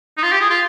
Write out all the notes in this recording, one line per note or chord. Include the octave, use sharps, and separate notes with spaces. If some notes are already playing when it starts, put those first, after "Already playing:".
D#4
F4
G4
G#4
F4